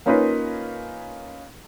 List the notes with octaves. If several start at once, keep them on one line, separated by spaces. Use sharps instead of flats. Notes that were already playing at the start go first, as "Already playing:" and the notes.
A#3 C#4 D#4 F4 A#4 B4